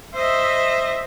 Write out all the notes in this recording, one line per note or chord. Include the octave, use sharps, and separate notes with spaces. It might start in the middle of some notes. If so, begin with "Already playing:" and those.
C5 D#5 E5